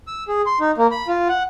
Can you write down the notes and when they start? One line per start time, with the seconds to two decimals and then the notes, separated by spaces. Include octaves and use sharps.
0.07 E6
0.28 G#4
0.46 C6
0.60 D#4
0.78 A#3
0.92 B5
1.08 F4
1.29 F#5